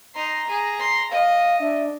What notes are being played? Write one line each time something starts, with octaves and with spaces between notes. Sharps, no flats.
D#4 A#5 C6
G#4
C6
D#5 F5
D4 E5